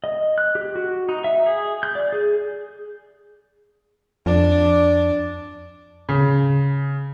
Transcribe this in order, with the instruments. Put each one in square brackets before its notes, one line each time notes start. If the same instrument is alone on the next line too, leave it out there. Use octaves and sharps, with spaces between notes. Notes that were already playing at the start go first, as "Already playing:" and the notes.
[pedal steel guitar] D#5
F#6
G4
F#4
D#4
E5
G#4
G6
D5
G#4
[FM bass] F2 [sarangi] D4
[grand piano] C#3